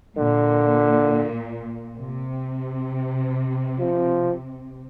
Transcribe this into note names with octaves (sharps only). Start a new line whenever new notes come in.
A#2 D3
C3
F3